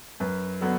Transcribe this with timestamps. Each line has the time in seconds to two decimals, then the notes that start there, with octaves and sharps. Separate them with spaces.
0.20 F#2 B4
0.61 D3 F#3 B3